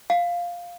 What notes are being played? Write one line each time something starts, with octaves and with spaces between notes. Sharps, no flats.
F5